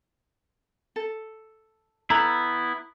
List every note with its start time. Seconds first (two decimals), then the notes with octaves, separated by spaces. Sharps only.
0.96 A4
2.10 B3 E4 A4 A#5 B5